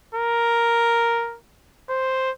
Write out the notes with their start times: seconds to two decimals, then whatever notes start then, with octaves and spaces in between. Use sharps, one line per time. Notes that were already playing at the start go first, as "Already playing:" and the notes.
0.15 A#4
1.90 C5